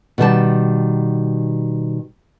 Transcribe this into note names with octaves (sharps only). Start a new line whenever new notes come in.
B2 D#3 G3 A5